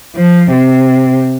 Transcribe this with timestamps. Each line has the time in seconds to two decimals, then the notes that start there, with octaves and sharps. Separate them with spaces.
0.16 F3
0.51 C3